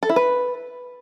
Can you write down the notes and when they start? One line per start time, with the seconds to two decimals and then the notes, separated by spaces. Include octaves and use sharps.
0.03 A4
0.09 E4
0.16 B4